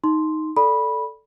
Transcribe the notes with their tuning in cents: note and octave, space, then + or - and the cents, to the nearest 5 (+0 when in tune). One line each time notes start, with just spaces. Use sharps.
D#4 +5 C6 +0
A4 +0 D5 +0 B5 -10